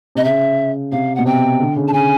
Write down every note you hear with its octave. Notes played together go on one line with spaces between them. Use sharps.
C3 D#5
C#3 E5
C3 F5
B2 F#5
C3 G5
D3
C#3
A5
C#3 G#5